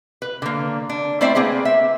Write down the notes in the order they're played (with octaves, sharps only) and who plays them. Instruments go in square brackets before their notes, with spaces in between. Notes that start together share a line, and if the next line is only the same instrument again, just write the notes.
[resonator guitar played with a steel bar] B4
D3 A#3
D4
A3 C4 E4 C5 D5 E5
A#3 C4 G#4 B4
E5